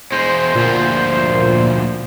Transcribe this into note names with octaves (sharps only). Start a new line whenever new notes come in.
E2 G#3 C5
D2 A#2 F3